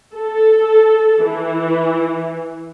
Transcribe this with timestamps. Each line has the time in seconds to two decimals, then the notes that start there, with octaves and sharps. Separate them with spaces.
0.14 A4
1.25 E3